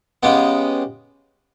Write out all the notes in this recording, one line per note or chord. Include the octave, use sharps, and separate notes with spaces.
C#3 G#3 B3 G4